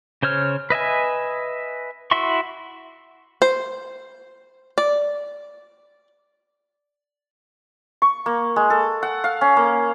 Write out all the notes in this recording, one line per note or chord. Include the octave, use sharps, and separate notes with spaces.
C#3 C5 C#5 F6
B4 D#5 E5 G#5
E4 F#4 E5 C6 C#6
C5
D5
C#6
A#3
G#3
A4
F#5
F5
C#4
A#3